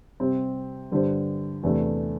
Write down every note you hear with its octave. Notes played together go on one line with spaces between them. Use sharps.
C3 G3 C4
G2 D3 G3 D4 C5
E2 C3 A3 D4 A4